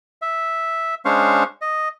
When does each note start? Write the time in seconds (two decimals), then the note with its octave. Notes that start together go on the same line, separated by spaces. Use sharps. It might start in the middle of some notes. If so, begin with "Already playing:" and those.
0.22 E5
1.05 G#3 C#4 D4 C5 F5 C#6
1.62 D#5